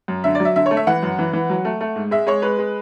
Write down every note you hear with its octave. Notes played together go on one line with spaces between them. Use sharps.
F#2
D3 E5
D5
F#3
E5
D3 E5
A3 C#5
E5
E3 F#5
F#2
E3
E3
F#3
A3
A3
G#2
G#3 E5
G#3 C#5
G#3 B4
G#3